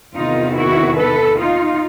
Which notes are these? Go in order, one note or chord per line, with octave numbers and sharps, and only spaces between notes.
E2 C3 D#3 D#4 F4
E4 F#4
A4 B4
D#4 F4